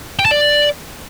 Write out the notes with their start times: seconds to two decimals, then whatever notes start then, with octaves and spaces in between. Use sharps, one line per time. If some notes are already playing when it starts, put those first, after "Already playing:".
0.19 G5
0.25 A5
0.31 D5